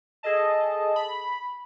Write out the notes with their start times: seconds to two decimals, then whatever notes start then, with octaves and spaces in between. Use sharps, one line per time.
0.23 G#4 A4 D#5 A5
0.96 B5